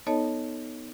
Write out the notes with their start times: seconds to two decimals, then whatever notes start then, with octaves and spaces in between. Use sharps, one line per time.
0.07 B3 D#4 A4 C#5 D#5 A5